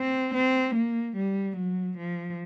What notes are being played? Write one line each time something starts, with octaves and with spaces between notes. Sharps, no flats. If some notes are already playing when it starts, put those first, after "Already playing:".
Already playing: C4
C4
A#3
G3
F#3
F3